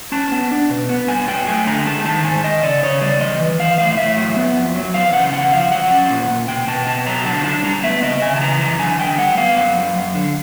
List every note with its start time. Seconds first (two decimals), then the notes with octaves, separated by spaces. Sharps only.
0.12 C#4 A5
0.32 B3
0.51 D4
0.70 B2
0.89 B3
1.08 G2 G#5
1.28 F#3 G5
1.47 A3 G#5
1.67 D3 A#5
1.86 G#3 A5
2.05 D#3 A5
2.24 G#2 G#5
2.44 D#3 D#5
2.63 C#3 D5
2.83 C#3 C#5
3.01 G3 D5
3.20 E3 D#5
3.40 E3
3.59 E3 F5
3.78 A2 F5
3.97 A2 E5
4.17 F#3
4.36 B3
4.56 F2
4.75 F#3
4.94 E2 F5
5.13 C#3 F#5
5.33 E2 F#5
5.52 F3 F5
5.71 F#3 F#5
5.91 C#4
6.10 A#2
6.30 A#2
6.48 B2 G5
6.67 B2 A5
6.87 B2 A5
7.06 F#3 A#5
7.26 D3 A5
7.44 D4 A5
7.64 G3 A#5
7.83 B3 E5
8.03 C#3 D#5
8.22 C#3 G#5
8.36 A5
8.41 E3 A#5
8.61 F#2 A#5
8.79 D3 G#5
9.00 D3 G5
9.18 G3 F#5
9.37 B3 F5
9.56 F#2
9.77 F#2
9.95 F#2
10.15 D3